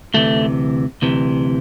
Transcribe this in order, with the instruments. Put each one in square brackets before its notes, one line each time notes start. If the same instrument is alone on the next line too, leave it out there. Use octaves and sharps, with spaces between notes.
[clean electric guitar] D2 C3 E3 A3
D2 C3 E3